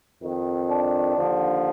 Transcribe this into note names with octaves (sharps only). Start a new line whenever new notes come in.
F2 D#3
D4
D#2 D3 F3